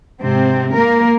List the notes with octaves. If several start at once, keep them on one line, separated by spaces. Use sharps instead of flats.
G#2 C3 C4
A#3 A#4